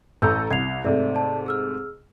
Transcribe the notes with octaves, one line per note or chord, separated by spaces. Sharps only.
A1 A4 A#5 E6 G6
C2 G#6 C7 F7
G#2 C3 A3 D5 E5
D5 A5
G#4 E6 F6